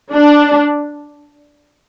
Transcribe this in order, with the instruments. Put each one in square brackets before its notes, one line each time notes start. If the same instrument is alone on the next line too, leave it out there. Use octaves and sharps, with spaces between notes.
[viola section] D4